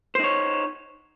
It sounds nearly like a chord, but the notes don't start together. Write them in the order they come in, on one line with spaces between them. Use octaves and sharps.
C5 D#4 C#5